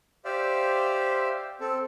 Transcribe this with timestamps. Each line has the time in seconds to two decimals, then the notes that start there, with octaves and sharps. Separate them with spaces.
0.25 G4 C5 D5 E5 F5
1.61 C4 A4